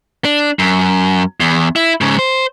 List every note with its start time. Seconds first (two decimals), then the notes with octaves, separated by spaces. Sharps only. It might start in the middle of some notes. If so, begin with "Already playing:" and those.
0.25 D4
0.59 F#2
1.40 E2
1.76 E4
2.01 G#2 C#3
2.19 C5